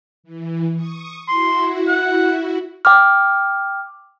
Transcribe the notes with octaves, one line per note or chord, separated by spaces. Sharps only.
E3
C#6 D#6
E4 F#4 C6
F#5
G5 D6 F6